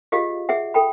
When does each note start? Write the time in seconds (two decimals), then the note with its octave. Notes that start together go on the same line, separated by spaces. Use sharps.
0.12 F4 G4 G#4 D#5 F5
0.49 G#4 E5 F#5
0.74 A4 G5 B5